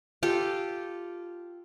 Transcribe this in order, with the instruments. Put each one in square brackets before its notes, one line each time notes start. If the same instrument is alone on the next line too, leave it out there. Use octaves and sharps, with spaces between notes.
[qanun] F4 G4 A4